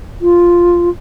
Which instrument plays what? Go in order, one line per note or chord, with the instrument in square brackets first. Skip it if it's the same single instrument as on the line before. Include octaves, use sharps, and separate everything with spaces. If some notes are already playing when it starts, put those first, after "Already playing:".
[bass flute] F4